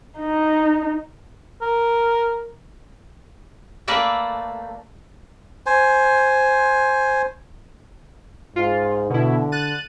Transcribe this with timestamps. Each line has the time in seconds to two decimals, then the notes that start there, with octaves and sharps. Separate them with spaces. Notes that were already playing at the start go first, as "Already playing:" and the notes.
0.19 D#4
1.62 A#4
3.88 A3 A#3 B4 D5 E5
5.66 C5 G#5
8.56 G#2 F4
9.10 B2 D3 E4
9.52 F#6 A6 D#7